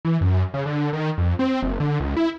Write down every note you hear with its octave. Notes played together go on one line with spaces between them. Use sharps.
E3
F#2
C#3
D3
D#3
F2
C4
F#1
D3
C#2
E4